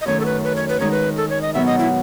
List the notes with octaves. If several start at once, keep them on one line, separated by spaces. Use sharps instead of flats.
D#5
F#2 D#3 A3 C#4 C#5
A4
B4
B4
C#5
B4
D#3 G#3 D#4 C#5
B4
A4
C#5
D#5
B2 F#3 B3 E5
D#5
E4